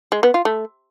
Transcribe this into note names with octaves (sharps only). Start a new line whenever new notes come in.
G#3
B3
F4
A3